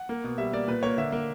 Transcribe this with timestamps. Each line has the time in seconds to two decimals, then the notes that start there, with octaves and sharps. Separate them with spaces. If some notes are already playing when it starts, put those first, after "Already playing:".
Already playing: F#5
0.09 A#3
0.24 B2
0.38 G3 E5
0.53 A#3 D5
0.68 A#2 B4
0.83 A#3 C#5
0.98 D3 E5
1.12 A#3